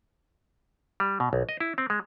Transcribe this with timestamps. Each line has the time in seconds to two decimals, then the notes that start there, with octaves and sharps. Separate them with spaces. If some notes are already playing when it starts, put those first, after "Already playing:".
1.00 G3
1.20 B2
1.33 B1
1.49 D#5
1.60 E4
1.78 C4
1.90 G#3